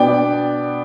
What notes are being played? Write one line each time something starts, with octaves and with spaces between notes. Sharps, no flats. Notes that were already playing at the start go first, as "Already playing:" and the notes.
Already playing: B2 B3 D4 D5 G5